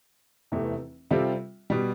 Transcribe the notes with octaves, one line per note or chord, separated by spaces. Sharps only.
F1 E2 C3 E3 A3
C3 G3 C4 F4 A4
B2 G3